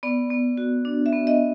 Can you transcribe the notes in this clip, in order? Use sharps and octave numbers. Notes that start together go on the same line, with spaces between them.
B3 D5
B3
F#4
D4
E5
B3
D#5